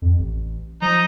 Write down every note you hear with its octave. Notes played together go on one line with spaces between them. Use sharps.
F2
A1
F3 D#4 A#5